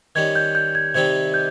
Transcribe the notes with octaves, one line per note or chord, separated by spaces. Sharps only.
D#3 G3 C#4 G#6
G6
G6
G#6
C3 D#3 G3 C4 G#6
G6